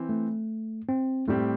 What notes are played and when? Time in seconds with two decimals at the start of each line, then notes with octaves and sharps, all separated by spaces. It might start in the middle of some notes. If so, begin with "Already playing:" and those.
Already playing: E3 C4
0.09 A3
0.89 C4
1.28 A2 G3 A3 C4 G4